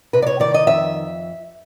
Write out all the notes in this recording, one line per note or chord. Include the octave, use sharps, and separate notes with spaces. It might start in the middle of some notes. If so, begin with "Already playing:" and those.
C3 B4
D5
C#5
D#3 D5
D#5
F2 E5